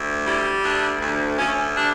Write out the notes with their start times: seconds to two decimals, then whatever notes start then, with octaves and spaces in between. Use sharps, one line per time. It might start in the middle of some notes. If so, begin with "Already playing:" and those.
Already playing: D2
0.25 G3 E4
0.63 D2 D4
1.01 D2
1.38 D2 C#4
1.76 G3 D4